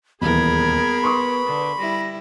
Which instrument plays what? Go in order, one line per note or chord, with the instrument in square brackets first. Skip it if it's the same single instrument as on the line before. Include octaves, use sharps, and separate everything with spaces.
[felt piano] D#1 E2 [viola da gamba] B3 G#4 A#4 [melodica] B5 [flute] G#6
[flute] B4 [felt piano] C6 C#6 D#6
[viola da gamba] D3
[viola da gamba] G3 E4 [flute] A#6